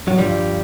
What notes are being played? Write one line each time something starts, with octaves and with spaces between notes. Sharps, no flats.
F#3
G2 D3 F3 G3